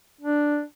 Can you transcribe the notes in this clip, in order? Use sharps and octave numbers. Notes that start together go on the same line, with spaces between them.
D4